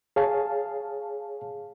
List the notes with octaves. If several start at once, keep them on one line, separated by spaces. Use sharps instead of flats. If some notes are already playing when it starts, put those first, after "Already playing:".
G#4 C#5 F5 A5